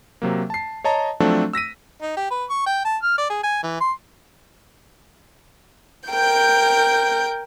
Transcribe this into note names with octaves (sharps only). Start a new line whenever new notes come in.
C3 F#3 A#3
A5 C7
C#5 D#5 A5 A#5
F3 F#3 A3 C4 D4 A4
E6 A#6 B6 D#7
D#4
G4
B4
C#6
G5
A5
F6
D5
G#4
G#5
E3
C6
A#4 G5 G6